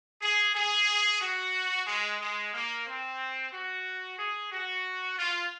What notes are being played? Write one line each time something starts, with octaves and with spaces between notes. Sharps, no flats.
G#4
G#4
F#4
G#3
G#3
A#3
C4
F#4
G#4
F#4
F4